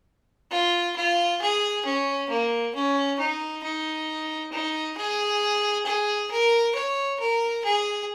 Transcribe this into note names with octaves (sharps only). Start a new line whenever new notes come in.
F4
F4
G#4
C#4
A#3
C#4
D#4
D#4
D#4
G#4
G#4
A#4
C#5
A#4
G#4